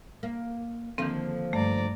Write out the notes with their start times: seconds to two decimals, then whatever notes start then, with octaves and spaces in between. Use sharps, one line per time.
0.23 A#3
0.98 D3 D#3 F3 A#3 C4
1.53 G2 A3 D5 A#5